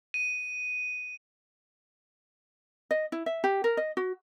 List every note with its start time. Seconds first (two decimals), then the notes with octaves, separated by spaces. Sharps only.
0.14 D#7
2.91 D#5
3.12 E4
3.26 E5
3.44 G4
3.64 A#4
3.77 D#5
3.97 F#4